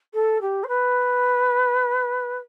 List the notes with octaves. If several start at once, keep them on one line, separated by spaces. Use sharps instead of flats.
A4
G4
C5
B4